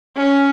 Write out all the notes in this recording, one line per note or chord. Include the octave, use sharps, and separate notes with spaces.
C#4